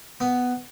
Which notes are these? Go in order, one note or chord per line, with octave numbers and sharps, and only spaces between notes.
B3